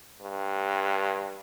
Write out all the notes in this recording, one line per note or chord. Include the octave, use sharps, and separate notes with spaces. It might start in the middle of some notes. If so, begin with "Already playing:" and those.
G2